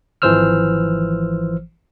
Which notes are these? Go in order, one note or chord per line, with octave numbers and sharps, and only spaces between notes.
G#1 E3 F3 C5 E6 F6